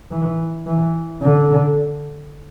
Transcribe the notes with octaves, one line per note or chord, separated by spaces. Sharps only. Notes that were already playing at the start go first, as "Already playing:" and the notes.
E3
E3
D3